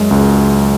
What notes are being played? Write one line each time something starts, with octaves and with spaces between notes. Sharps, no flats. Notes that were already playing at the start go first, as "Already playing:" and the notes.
Already playing: F#2 G#3
C#2